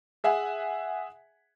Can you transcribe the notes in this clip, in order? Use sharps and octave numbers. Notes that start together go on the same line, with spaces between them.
G#4 E5 F#5 G#5